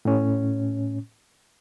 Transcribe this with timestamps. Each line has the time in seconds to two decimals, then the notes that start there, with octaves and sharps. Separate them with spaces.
0.05 A2 C#4